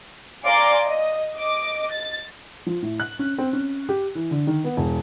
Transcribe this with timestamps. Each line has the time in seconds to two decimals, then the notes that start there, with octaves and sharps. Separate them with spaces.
0.44 D5 F5 G#5 A#5 C6 D6
0.86 D#5
1.34 D#5 D6
1.91 A6
2.67 F3
2.82 A2
3.00 F#6
3.19 C#4
3.38 C4
3.53 C#4
3.89 G4
4.15 E3
4.31 D3
4.47 D#3
4.64 B3
4.77 E1